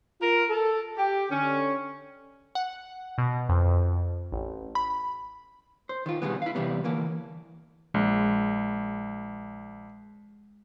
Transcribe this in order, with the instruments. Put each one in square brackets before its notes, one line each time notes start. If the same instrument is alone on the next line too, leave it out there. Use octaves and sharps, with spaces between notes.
[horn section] F4 A#4
A4
G4
D3 C#4
[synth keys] F#5
B2
F2
A1
B5
[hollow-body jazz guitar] C5
D#3 F4
B2 D3 D#3 G3 G#3 B3
E4 F5
C3 E3 G3 B3
D3 E3 A#3
[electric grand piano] A#1 [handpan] G#3